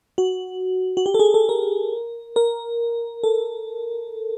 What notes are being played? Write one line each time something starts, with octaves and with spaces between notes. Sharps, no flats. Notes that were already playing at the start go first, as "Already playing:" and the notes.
F#4
F#4
G4
A4
G#4
A4
A#4
A#4
A4